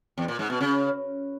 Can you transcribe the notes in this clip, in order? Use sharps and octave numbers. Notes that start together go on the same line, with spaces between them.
E2
A#2
G#2
B2
C#3